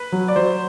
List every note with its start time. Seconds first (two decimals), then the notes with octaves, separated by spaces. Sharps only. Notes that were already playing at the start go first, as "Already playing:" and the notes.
Already playing: B4
0.12 F#3
0.28 D5
0.36 F#3 C5